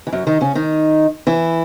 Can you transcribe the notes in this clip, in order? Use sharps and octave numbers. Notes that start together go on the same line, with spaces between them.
E3
F#2 F#3
D#3 D#4
C#3 C#4
D#3 D#4
E3 E4